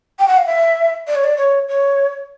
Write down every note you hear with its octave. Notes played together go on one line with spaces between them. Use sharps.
G5
F#5
F5
E5
D5
C#5
D5
C#5
C#5